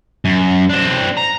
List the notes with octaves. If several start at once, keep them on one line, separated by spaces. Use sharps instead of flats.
F#2
C4 D4
A#5